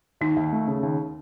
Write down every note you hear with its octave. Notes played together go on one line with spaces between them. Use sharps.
D#2 D#4
D#2
A3
C#3
D#2